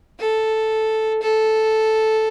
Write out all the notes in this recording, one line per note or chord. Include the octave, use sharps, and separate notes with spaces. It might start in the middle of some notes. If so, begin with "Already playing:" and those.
A4
A4